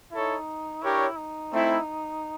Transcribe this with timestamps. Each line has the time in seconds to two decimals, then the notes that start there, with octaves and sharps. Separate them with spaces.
0.12 D#4 E4 A4 C#5
0.83 D4 E4 G4 A#4 C#5
1.17 D#4
1.53 A3 C4 E4